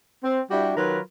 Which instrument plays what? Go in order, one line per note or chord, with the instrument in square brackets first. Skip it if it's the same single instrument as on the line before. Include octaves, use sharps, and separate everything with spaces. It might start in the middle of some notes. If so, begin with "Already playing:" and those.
[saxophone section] C4
G3 D4 E4 F#4 G4
D#3 F#3 F4 A#4 B4